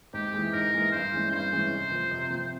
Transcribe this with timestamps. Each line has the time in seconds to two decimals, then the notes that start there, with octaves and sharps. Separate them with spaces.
0.14 G#2 G4
0.34 E3 G#3
0.53 G#2 A#4
0.73 E3 G#3
0.92 G2 C5
1.12 E3 G#3 C#4
1.32 G2 C5
1.52 E3 G#3 C#4
1.71 C3
1.91 F3 C4
2.11 C3
2.30 F3 C4